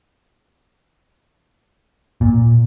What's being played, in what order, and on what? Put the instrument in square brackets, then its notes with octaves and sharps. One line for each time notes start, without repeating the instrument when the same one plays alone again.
[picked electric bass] A#2